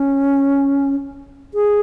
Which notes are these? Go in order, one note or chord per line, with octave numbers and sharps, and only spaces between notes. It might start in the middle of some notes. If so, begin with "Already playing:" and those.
Already playing: C#4
G#4